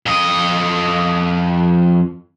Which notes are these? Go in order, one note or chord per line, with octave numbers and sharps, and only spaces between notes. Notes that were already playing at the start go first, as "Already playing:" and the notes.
F2 D#5